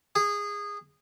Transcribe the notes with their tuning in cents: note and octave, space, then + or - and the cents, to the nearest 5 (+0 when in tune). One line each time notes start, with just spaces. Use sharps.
G#4 -20